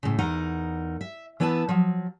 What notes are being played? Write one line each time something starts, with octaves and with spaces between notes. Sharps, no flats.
A2 C#3
E2 D#4 A#4 F#5
E5
E3 B3 E4 B4 G#5 A5
F3 F#3